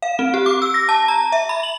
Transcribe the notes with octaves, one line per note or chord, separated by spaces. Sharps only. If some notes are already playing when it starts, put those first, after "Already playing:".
F5
C4
G4
D6
E6
A#6
A5
A#5
E5
B5
F#7